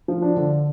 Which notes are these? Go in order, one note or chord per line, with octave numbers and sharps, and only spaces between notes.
F3
D4
D3